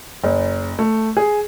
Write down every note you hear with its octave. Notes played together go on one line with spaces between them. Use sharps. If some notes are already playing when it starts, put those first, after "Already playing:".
F#1
A3
G#4